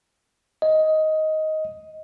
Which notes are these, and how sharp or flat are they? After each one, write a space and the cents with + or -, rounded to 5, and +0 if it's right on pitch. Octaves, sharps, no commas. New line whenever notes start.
D#5 +10